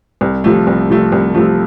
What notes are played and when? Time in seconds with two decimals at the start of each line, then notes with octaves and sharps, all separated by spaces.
0.21 C2
0.44 C3 F3 A3
0.67 C2
0.90 C3 F3 A3
1.12 C2
1.34 C3 F3 A3